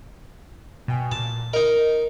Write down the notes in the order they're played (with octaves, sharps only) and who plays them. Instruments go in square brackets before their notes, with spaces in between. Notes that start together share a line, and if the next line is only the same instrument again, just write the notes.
[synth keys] B2 G5 G#5
[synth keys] A#2 [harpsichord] A5
[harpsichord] D#4 A#4 [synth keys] D#5